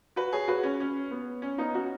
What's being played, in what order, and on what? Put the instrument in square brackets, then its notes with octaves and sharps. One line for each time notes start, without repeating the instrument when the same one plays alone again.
[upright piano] F#4 B4
G#4 C#5
F#4 B4
C#4
C#4
B3
C#4
B3 D#4
C#4 F#4